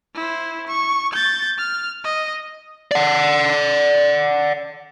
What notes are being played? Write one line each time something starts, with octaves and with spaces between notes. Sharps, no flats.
E4 C5
C#6
G6 A6
F6
D#5
D5 F#5